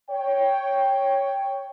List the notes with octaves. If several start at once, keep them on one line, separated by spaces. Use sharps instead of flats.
C#5 G5